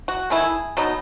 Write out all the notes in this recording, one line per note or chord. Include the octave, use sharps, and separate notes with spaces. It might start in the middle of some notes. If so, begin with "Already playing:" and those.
F#4
D#3 A3 E4 G#4
B2 F#3 B3 D#4